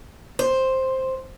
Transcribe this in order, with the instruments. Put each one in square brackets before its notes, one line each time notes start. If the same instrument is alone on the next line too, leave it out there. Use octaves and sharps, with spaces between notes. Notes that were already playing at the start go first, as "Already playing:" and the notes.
[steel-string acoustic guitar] C5